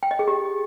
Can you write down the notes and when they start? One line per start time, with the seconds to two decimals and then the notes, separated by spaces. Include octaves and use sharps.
0.03 G5
0.11 D#5
0.19 G#4
0.28 G4